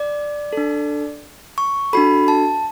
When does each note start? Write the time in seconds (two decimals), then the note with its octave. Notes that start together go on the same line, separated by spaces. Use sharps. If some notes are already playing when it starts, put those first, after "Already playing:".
Already playing: D5
0.53 D4 A4
1.58 C#6
1.93 D4 F#4 A4 B5
2.28 A5